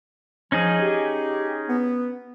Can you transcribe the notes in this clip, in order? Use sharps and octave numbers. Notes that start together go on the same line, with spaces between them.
F3 C#4 D#4 G#4
G4
B3